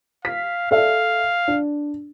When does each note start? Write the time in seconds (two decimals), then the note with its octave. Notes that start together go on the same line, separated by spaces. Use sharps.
0.25 F5 B6
0.71 A4 D5 E5 F5
1.48 D4